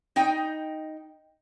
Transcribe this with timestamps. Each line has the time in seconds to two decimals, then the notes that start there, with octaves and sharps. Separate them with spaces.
0.16 D#4 D#5 G5